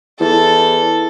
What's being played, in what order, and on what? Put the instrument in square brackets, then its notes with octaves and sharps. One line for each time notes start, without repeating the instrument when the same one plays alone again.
[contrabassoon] E2 [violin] A4